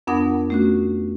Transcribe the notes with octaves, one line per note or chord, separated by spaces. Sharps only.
F2 B3 D4 A#4 F#5 D#6
A3 C#4 F#4